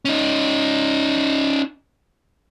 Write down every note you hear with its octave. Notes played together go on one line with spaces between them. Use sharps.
C#4 D#4